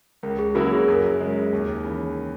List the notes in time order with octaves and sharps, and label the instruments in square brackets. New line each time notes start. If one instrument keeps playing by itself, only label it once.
[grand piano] C#2 [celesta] A#4
[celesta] G#4
[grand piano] C#3 F#3 A#3 E4 [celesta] F#4
[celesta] G#4
[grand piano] F#2 [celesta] A#4
[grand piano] C#3 G#3
D#2
C#3 E3